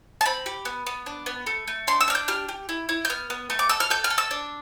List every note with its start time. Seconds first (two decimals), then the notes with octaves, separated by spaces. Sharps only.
0.21 A5
0.25 C4 B5
0.46 G4
0.65 B3
0.87 B3
1.06 D4
1.26 B3
1.46 A3
1.68 A3
1.87 D4 C6
2.01 E6
2.08 D4 F6
2.15 G6
2.28 G4 F6
2.49 G4
2.69 E4
2.89 E4
3.05 G6
3.10 B3 F6
3.30 B3
3.50 A3
3.59 D6
3.69 A4 E6
3.80 F6
3.90 A4 G6
4.04 F6
4.10 A4
4.18 E6
4.31 D4